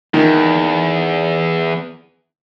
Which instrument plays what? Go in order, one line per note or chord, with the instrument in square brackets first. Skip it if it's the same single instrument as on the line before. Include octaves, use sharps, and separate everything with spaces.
[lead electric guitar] E2 [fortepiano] D#3